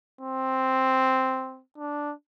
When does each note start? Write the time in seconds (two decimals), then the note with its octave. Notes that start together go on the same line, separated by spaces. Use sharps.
0.21 C4
1.78 D4